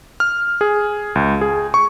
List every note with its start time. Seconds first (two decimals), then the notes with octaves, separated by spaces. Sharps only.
0.20 F6
0.61 G#4
1.15 C#2
1.41 G#4
1.74 C#6